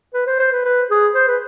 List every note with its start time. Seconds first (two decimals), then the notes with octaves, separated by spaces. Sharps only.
0.14 B4
0.27 C5
0.40 C5
0.53 B4
0.65 B4
0.91 G#4
1.15 C5
1.28 B4